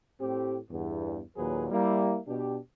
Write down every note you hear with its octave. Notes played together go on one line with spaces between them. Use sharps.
A2 C4 G4
E2 G2 B3
D#2 A#2 F#3 G#4 A#4 B4
G3 A#3 E4
B2 D4 G4